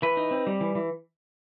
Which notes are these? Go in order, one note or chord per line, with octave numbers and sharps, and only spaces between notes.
E3 B4
D#4
C4
G3
E3
E3